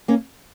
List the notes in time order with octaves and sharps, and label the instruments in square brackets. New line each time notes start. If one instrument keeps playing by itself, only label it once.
[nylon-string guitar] A#3 C#4